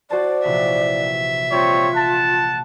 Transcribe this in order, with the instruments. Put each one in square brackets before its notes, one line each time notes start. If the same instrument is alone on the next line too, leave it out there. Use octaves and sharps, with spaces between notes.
[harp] F#4 C5 A5 [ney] D5
[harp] A#1 C3 E3 [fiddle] E5
[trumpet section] G3 C4 C#5 [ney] F4
[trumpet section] F#5 A5